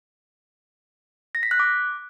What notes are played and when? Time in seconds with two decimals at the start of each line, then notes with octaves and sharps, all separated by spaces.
1.35 A#6
1.43 B6
1.51 F#6
1.60 D6